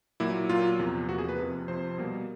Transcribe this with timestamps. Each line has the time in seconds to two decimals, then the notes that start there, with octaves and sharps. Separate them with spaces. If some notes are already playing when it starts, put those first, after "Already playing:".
0.20 A#2 F#3 A#3 E4
0.49 A#2 F#3 A#3 F4
0.79 E2 C3 F3 A#3
1.08 E2 C3 F3 A#3 F#4
1.18 G#4
1.29 B4
1.38 F2 C3 F3
1.68 F2 C3 F3 C5
1.98 B2 G3 A#3